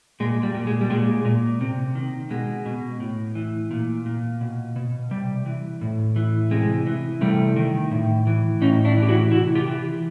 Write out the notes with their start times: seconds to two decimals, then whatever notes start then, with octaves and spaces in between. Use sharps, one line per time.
0.20 A#2 G#3
0.43 G3
0.55 A#2
0.67 G#3
0.81 G3
0.90 A#2 G#3
1.25 A#2
1.61 C3
1.95 D#3
2.30 B2 G#3
2.66 B2
3.00 A2
3.35 E3
3.71 A#2
4.06 A#2
4.41 B2
4.76 B2
5.11 C3 G3
5.46 E3
5.81 A2
6.16 E3
6.51 C3 G#3
6.87 E3
7.21 C3 G3 A3
7.56 D#3
7.91 A2
8.27 E3
8.61 A2 C#4 D#4
8.85 D4 E4
8.97 E3
9.03 G4
9.09 E4 F#4
9.31 C3 E4 F#4
9.55 F4 G4
9.67 E3